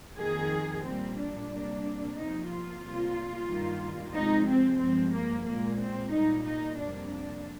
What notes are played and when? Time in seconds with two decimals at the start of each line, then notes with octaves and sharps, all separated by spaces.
0.18 F2 D#3 A#3 G#4
0.84 A#2 G3 A#3 C4
1.18 D4
1.50 C3 G3 A#3
2.16 C3 F3 A#3 D#4
2.49 F4
2.82 C3 G3 A#3
3.48 G2 D#3 G3 A#3
4.14 C3 F3 G#3 D#4
4.47 C4
4.80 G2 F3 G#3 C4
5.13 A#3
5.45 A#2 G#3 A#3
5.79 C4
6.11 A#2 G3 A#3 D#4
6.44 D#4
6.78 F2 C3 G3 A#3 D4
7.10 D4